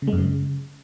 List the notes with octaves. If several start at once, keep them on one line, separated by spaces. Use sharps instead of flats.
C#3
G#3
F#2
C#3